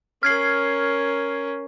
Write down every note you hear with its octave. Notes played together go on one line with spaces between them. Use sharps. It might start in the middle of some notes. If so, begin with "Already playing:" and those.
C#4 A#4 F6 G#6 C7